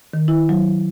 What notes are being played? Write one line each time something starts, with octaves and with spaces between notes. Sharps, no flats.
D#3
E4
F#3